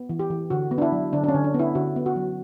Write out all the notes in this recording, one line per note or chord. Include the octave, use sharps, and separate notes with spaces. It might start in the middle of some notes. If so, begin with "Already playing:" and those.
Already playing: B3
E3
G4
E3
D3 F#4
B3
D4
E4
F#3
D3 D4
D4
C#4
D3
D4
B3
E4
D3 F#4
B3
F#4
F#3